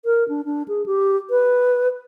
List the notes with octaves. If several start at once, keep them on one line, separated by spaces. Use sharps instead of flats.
A#4
D4
D4
G#4
G4
B4